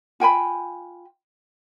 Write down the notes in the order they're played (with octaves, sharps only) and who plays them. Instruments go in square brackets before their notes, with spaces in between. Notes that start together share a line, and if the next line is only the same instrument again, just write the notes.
[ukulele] F4 G5 G#5 B5